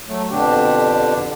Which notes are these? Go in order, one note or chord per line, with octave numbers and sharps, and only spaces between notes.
F#3 A3
F2 B2 D3 D4 G4